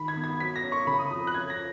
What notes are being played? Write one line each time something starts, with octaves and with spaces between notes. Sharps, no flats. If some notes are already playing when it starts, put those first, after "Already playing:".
Already playing: D#3 B5
G#6
B3
G#6
F#3 B6
A#6
C#4
C#6
C#3 B5
D#6
F2 D#6
F#6
C#4 G#6
A#6